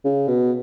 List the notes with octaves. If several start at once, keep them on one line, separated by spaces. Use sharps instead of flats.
C#3
B2